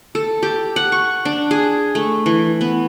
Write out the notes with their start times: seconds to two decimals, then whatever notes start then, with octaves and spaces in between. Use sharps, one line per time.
0.15 A4
0.43 G4
0.76 F#5
0.92 C#6
1.25 D4
1.51 G#4
1.95 A3
2.26 E3
2.61 B3